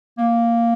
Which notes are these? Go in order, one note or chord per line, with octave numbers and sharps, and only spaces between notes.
A#3